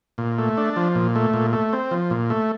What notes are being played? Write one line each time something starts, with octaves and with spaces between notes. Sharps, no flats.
A#2
A3
D4
F3
A#2
A3
A#2
A3
C4
F3
A#2
A3